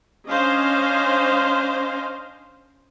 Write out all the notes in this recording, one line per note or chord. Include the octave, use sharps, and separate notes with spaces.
C#4 D4 C5 D#5 F5